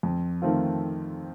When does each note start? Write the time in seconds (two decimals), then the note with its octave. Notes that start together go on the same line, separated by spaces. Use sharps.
0.03 F2
0.42 D#3 A3 C4 F4